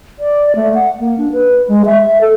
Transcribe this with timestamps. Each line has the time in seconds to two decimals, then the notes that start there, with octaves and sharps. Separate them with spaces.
0.19 D5
0.56 A3
0.75 F#5
1.00 A#3
1.18 D4
1.33 B4
1.68 G#3
1.85 E5
2.02 E5
2.21 A4